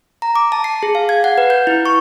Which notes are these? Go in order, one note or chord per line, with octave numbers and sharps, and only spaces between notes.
A#5
D6
A5
C7
G#4
F5
G#6
F#5
B4
G6
E4
C#6